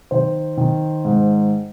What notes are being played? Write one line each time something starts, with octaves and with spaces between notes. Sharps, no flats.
D#3 C5
D#3
G#2